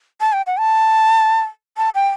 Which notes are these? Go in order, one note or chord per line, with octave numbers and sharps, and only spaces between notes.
A5
G5
F#5
A5
A5
G5